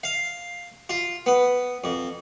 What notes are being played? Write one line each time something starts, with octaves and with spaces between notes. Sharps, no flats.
F5
F4
B3
F2